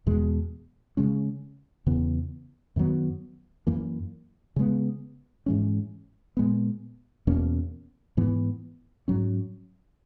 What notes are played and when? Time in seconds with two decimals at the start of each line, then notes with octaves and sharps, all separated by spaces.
0.07 E2 B2 G#3
0.97 C#3 G#3 C#4
1.86 E2 C#3 E3 B3
2.76 F#2 D#3 F#3 B3
3.67 F#2 E3 A#3
4.56 C#3 G#3 B3
5.46 G#2 E3 G#3 C#4
6.37 A#2 G#3 B3
7.27 E2 B2 A#3 C#4
8.17 G#2 E3 B3
9.08 G#2 F#3 C#4